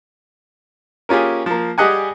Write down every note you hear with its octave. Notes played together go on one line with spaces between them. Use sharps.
A#3 C#4 F4 G4 G#4
F3 A#3
G3 G4 G#4 D#5 F#5 G#5